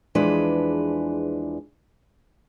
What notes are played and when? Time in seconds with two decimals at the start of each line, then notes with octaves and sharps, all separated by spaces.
0.15 E2 E3 F3 G#3 D4 B4